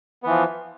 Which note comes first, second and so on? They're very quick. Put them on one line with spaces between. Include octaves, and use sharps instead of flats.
B3 E3 F3